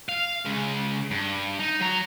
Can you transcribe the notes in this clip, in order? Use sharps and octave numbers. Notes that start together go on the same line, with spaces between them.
F5
C#3 G#3
G2
D#4
F#3 A#5